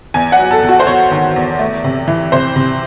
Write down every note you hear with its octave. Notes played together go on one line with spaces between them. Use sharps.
E2 G#5
F#5
F#3
A4
E2
F#4
C5
E2 C#5
D#3
E2
A3
C3
E3
C3 C5
C3